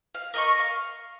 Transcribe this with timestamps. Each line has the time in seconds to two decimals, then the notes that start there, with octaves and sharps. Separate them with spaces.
0.15 F5
0.34 A#4 D#5 G5 C#6
0.59 F5